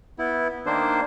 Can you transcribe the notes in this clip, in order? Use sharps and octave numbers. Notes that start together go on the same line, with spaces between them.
B3 E4
D#3 A#3 D4 C5